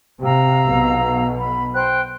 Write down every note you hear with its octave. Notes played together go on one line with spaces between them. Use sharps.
C3 F5 A#5 E6
B1 B2
B5
C5 G5 F#6